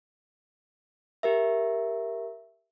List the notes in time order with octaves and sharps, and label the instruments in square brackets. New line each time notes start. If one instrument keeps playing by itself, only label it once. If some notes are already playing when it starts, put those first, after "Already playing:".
[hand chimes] G4 A#4 E5